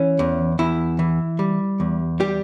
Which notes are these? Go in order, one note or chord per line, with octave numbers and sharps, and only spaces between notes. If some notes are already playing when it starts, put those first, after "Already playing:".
Already playing: E3 C#4
E2
E2 E4
E3
G3
E2
G3 G4